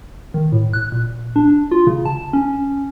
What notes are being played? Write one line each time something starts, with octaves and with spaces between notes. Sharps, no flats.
D#3
A2
F#6
A#2
D4
F4
C#3
A5
C#4